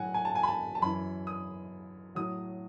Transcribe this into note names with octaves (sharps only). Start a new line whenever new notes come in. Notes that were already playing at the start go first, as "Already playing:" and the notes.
Already playing: A2 F#3 F#5 G#5
G#5
A5
G#5
B5
A5
A5
F#2 E3 B5
D#6
A2 F#3 D#6